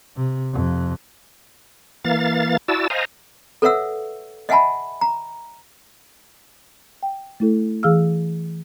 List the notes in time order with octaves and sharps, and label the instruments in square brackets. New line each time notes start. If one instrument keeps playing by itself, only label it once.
[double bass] C3
F2 C3
[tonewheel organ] E3 A#3 F5 A6
E4 F#4 D5 A5 E6
C5 D#5 F5 G#5 A#5
[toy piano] A4 B4 C#5 E5 F#5 E6
D#5 E5 F#5 G#5 A5 B5
A#5
[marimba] G5
A3 E4 A4
E3 G#4 F5 E6 F6